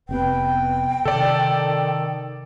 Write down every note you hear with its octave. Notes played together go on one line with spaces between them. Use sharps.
F1 C3 B3 B4 G5
C3 D#3 A4 D5